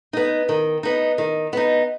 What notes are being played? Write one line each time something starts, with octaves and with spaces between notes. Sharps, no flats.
B3 D#4
D#3
B3 D#4
D#3
B3 D#4